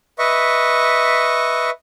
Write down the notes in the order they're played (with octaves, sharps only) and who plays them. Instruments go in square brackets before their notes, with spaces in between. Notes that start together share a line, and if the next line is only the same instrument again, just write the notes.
[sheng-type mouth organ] B4 D#5 E5 C#6